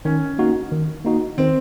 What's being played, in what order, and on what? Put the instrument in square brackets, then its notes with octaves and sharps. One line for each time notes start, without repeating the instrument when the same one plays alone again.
[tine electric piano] D#3 [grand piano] C#4
[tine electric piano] A#3 D#4 F#4
D#3
A#3 D#4 F#4
[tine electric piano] D#3 [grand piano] C4